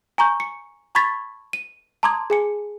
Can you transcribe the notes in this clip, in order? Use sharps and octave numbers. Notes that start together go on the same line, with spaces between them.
G#5 A#5 C#6 G6
C#7
A5 B5 C#6 G#6 A6 B6
D#7
A5 A#5 C6 D6 D#6 G#6
G#4 G#5 C#7